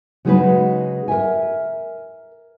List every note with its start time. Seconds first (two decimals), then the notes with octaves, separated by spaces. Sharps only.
0.25 C#3 F#3 G#3 D#4 F#4 B4
1.08 A#4 E5 G#5